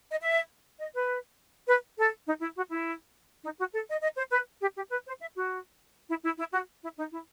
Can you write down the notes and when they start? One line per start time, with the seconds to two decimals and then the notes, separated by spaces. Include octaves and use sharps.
0.11 D#5
0.21 E5
0.79 D#5
0.94 B4
1.68 B4
1.97 A4
2.27 D#4
2.40 E4
2.56 F#4
2.70 E4
3.43 D#4
3.58 F#4
3.73 A4
3.88 D#5
4.02 D#5
4.17 C5
4.31 B4
4.61 G4
4.76 G4
4.90 B4
5.06 C5
5.21 E5
5.35 F#4
6.09 E4
6.23 E4
6.38 E4
6.53 F#4
6.82 E4
6.97 D#4
7.12 E4